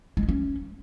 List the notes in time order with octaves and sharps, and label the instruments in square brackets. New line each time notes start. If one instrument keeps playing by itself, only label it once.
[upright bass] G#3
E4
C#4